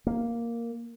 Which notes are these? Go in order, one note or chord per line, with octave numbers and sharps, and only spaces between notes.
A#3